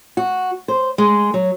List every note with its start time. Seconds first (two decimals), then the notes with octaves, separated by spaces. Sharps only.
0.17 F#4
0.68 C5
0.98 G#3
1.34 F#3